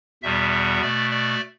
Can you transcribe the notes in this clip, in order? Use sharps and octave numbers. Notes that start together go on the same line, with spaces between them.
E2 B2 G3 B3 E5
E5
B2 A3 D5
D5